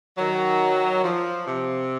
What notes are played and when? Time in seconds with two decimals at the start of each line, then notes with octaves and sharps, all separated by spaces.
0.18 D#3 F#3
1.03 F3
1.47 C3